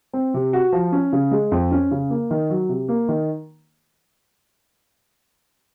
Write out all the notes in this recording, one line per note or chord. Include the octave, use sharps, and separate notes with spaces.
C4
C3
F#4
F3
C#4
C#3
G#3
F2
C#4
C#3
A#3
D#3
F#3
C3
A#3
D#3